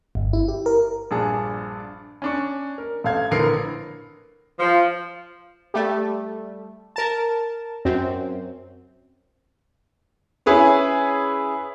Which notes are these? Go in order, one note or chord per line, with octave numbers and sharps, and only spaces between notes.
G1
E4
G4
A#4
A#1 G2 D4 G#4 A5
C#4 D4 C#6
A#4
A1 A4 F5 G#6
A#1 A2 D3 A#4 B4 C7
F3
G3 A3
A#4 A5
F#2 C4
C#4 E4 G#4 B4 C#5